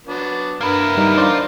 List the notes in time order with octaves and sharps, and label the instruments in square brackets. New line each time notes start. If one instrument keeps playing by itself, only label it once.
[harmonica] F#3 B3 D4
[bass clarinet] G2 [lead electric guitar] A#3 E4 [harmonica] B3 A#4
[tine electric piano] G3 [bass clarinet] D#4
[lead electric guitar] F3 F4 [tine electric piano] D4 C5 D5